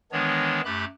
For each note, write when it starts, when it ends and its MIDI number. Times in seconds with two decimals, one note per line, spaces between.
0.12 0.61 51
0.12 0.61 52
0.12 0.61 56
0.12 0.61 59
0.12 0.61 62
0.12 0.61 73
0.65 0.85 42
0.65 0.85 57
0.65 0.85 67
0.65 0.85 83
0.65 0.85 90